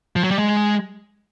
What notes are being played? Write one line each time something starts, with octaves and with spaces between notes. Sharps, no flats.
F3
F#3
G3
G#3